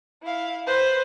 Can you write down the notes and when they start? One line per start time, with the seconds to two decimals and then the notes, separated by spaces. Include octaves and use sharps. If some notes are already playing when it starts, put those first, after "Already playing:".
0.23 E4 F5
0.66 B4 C5